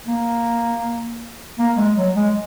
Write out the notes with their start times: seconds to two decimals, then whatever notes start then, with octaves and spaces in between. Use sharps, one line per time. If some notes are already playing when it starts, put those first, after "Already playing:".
0.07 A#3
1.59 A#3
1.77 G#3
1.96 F#3
2.15 G#3